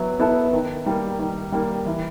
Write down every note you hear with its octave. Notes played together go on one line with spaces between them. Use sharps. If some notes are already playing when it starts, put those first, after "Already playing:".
Already playing: F#3 B3 E4
B3 E4 A4
D#3
G3 A#3
D#3
G3 A#3
E3